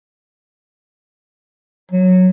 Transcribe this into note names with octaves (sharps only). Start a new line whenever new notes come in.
F#3